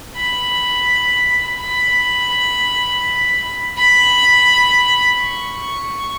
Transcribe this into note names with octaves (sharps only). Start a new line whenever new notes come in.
B5
B5
B5
C#6